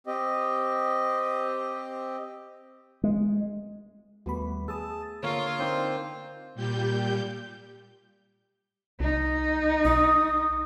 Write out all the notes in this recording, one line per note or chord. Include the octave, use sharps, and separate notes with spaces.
C4 G4 D#5
G#3
D#2 G3 A3 B3 F#4 B5
G#4 A5 D#6 E6
D3 A#3 F4 A#4 C#5
A#3 C4 D4 D#4 C5
A#2 G3 G4 G6
C2 D#4
B1 D#6